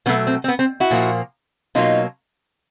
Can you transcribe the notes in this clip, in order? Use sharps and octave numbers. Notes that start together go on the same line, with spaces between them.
B2 F#3 A3 B3 C#4
C4
C4
B3
C4
E4 F#4
A#2 F3 A#3
B2 F#3 A#3 D#4 F4